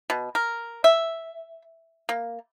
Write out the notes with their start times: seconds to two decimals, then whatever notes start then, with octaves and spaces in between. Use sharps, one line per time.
0.10 B2
0.35 A#4
0.84 E5
2.09 A#3